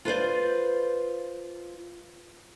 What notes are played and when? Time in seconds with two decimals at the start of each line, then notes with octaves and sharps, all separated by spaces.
0.05 F4 B4 C5 D5